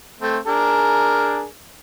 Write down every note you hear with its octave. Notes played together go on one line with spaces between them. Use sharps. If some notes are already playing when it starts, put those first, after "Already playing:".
A3 C4
D4 G#4 A#4